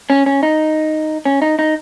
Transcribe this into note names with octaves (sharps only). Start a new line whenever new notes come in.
C#4
C#4
D#4
C#4
D#4
D#4